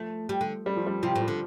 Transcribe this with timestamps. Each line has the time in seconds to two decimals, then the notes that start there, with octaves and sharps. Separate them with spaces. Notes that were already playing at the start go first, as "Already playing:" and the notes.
Already playing: F3 A3
0.29 G3
0.41 D3
0.66 G3
0.76 F3
0.87 G3
1.03 C3 F3
1.15 A2
1.21 F3
1.28 D3